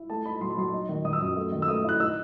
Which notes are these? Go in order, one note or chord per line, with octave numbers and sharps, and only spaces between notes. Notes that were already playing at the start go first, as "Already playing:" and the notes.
Already playing: E4
A3 A5
D#4 B5
F#3 C6
B5
F#3 C6
D#4
D#3
D#3 D#6
E6
F#2 D#6
A3
D#3
E6
A3 D#6
E4 F#6
D#4 E6